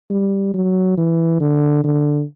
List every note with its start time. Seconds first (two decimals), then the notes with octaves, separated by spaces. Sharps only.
0.10 G3
0.54 F#3
0.97 E3
1.40 D3
1.84 D3